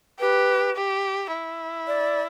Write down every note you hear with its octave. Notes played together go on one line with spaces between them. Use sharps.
G4 B4
G4
E4
D5